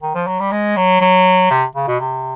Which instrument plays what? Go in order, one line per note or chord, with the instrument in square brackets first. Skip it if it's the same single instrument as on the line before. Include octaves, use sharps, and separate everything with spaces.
[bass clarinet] D#3
F3
F#3
G3
G#3
F#3
F#3
C3
C#3
B2
C3